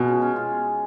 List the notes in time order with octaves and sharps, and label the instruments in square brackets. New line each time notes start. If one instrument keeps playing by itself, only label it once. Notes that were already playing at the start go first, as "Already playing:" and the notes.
Already playing: [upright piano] B2 [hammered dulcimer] G#3 F4
[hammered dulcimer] C#4
C#4
F4